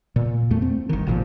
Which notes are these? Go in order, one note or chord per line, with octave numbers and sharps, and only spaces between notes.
A#2
E2 A3
C4
G1 D#3
G#1 A#2 D#3 F3